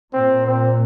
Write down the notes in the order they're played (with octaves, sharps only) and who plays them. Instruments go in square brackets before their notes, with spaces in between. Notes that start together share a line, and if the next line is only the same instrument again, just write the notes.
[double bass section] A#2 [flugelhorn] C4
[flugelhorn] C4